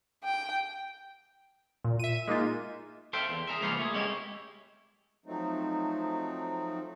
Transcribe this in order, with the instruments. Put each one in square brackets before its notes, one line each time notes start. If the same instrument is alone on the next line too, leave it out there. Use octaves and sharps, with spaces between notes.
[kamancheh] G5
[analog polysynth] A#2
E5 D#7
G#3 A#3 D#4 F4
[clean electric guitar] A4 C5 E5 F5 G5
E2
G#4 A#4 E5
C#2 F3 A#3 B3 C5 F5
A3 A#3 G#4
G#3 B3 C#4 E4 F4 G4
[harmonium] F3 F#3 A3 C4 D#4